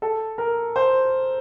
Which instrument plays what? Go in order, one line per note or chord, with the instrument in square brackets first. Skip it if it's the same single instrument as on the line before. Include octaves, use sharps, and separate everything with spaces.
[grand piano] A4
A#4
C5